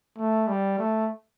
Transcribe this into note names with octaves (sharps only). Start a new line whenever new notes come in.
A3
G3
A3